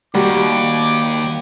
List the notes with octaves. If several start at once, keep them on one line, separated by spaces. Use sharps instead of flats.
D#2 G3 F#4 G4 D6